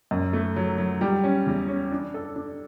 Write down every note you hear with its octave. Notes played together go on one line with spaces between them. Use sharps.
F#2
A3
F#3
F#3
G3
C#4
E2
C#4
D4
A4
D4